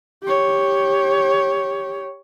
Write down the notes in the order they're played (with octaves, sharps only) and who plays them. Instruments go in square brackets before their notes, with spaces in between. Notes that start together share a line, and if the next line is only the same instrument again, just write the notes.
[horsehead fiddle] G4 C#5